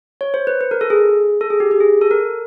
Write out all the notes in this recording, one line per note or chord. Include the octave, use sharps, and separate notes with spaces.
C#5
C5
B4
B4
A#4
A4
G#4
A4
G#4
G4
G4
G#4
A4
A#4